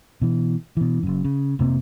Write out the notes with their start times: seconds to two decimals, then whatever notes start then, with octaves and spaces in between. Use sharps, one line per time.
0.22 B2 E3
0.77 B2 E3
1.03 F#1 F#2
1.24 C#3
1.59 F1 C3 A#3 C4